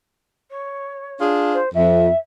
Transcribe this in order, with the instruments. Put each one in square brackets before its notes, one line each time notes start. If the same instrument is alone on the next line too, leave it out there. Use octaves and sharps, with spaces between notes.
[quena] C#5
[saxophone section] D4 F4 G#4
[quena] C5
[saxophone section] F2 [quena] E5